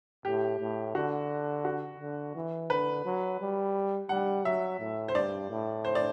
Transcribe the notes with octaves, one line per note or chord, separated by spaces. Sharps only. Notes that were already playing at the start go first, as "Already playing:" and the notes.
A2 G4
A2
D3 F#4
F#4
D3
E3
D3 B4
F#3
G3
G3 F#5
F#3 E5
A2
C5
G2 D5
A2
C5
D5